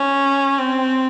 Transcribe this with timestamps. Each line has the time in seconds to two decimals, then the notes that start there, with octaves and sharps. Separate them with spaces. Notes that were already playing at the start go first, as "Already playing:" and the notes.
Already playing: C#4
0.58 C4